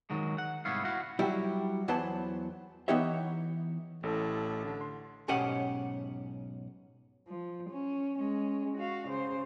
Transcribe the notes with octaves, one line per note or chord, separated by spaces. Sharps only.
D#3 F#3 G#3
F#5
C2 G#2 B3 E4 C#5 F5
E4 F#4 F5 F#5
F#3 G3 E4 F#4 G4
E2 E3 F#3 B3 C5 A5
E3 B3 D#4 G4 C#5 E5
A1 A2 A4
D3
C6
B1 G#2 C#4 G4 D#5 F#5
F3
C#4
G#3 C#4
F#4 F5
C#3 C5